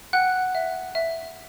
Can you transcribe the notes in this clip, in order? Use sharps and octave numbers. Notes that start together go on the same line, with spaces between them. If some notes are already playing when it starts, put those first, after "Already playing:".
F#5 G5 F#6
E5
E5